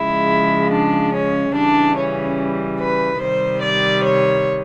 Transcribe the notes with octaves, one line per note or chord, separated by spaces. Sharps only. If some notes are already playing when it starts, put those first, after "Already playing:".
Already playing: C#3 F3 G#3 E4
D4
C#4
C#3 E3 G3 D4
C#4
B4
C3 D#3 G3 C5
D5
C#5